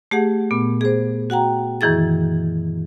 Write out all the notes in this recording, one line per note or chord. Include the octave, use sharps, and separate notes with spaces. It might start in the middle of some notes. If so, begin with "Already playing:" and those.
A3 G4 G#4 F#5
A#2 B3
G#4 C5
F#4 F#5 G5 A#5
F#2 D#3 E3 E4 G#4 A6